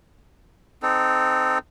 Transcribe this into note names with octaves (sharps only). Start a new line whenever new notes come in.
C4 D#4 A4